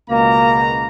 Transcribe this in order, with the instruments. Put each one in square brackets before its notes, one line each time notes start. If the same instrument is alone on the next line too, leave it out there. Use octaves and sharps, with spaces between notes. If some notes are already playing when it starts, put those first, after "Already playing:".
[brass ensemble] C#2 B2 A#5 [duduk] A#3